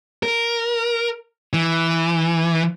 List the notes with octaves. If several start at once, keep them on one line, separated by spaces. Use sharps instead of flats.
A#4
E3